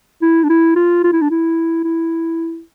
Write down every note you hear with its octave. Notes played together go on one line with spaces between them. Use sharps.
E4
D4
E4
F4
F4
E4
D4
E4
E4